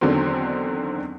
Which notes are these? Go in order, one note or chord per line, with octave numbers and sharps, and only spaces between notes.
E2 D3 D#3 F#3 C4